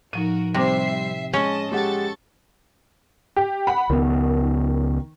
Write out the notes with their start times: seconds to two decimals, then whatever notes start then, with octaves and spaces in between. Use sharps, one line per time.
0.13 A2 F3 D#4 F#4 A#4 D#7
0.54 C3 G3 C4 C5 E5 D6 A#6 C7
1.33 G#3 C#4 D#5 A5
1.71 G#3 G4 A4 F#5 C#6 A6
3.36 G4
3.67 F#5 B5
3.90 C#2 D#3 B3